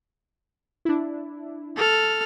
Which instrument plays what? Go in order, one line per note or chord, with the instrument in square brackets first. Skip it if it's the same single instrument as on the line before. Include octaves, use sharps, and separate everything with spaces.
[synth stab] D4 E4
[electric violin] A4 F6